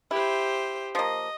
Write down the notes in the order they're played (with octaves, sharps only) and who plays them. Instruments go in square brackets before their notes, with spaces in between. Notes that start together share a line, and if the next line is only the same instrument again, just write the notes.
[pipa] E4 [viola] G4 C5
[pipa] F3 A#3 [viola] D#5